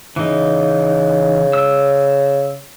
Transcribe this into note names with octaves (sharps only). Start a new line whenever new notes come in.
C#3 E3 D#4
E6